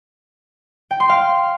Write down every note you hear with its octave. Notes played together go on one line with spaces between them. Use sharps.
G5
C6
F5